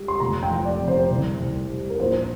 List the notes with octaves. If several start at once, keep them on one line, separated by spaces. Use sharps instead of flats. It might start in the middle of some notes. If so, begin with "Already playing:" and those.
Already playing: G3
C6
F1 A#5
G5
F3
D5
C3
C5
C2
C2
G3
A#4
A#1 C5